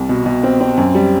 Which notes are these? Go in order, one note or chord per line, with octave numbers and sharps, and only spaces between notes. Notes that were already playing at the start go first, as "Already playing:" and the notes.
Already playing: C2
B2
B2
C4
C4
F#2
G3